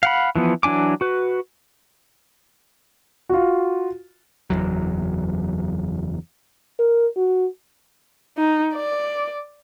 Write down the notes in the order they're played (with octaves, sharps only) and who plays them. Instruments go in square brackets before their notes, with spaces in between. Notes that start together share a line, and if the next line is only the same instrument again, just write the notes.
[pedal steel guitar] F5 F#5 B5
E3 F3 B3
E3 F#3 D4 G#5 D6
F#4 B4
[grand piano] F4 F#4
[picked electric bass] F#1 B1 E2 F#3
[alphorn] A#4
F#4
[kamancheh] D#4
D5